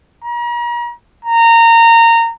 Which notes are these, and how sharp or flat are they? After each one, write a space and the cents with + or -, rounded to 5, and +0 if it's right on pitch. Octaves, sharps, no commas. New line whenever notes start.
A#5 +40
A#5 -20